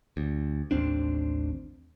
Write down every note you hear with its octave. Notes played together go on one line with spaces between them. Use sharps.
D2
A1 D#2 C4 D4